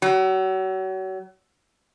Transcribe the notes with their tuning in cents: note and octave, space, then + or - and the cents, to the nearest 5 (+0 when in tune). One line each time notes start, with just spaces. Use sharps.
F#3 +35